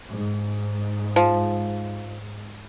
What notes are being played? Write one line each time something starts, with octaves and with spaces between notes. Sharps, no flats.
G#2
F3